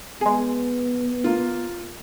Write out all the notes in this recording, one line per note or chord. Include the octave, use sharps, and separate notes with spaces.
G#3 B3 G#4
A#3 F4